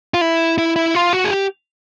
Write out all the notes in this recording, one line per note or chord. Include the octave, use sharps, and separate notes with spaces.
F4
E4
E4
E4
F4
F#4
G#4
G4